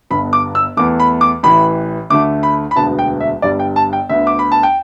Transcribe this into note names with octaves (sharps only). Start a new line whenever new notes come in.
G1 G2 D3 B3 B5
D6
E6
E2 E3 A3 D6
B5
D6
A1 A2 E3 B5
D2 D3 A3 D6
B5
B5
E1 D2 D3 B3 A5
G5
E5
G1 G2 G3 D5
G5
A5
G5
D2 D3 B3 E5
D6
B5
A5
G5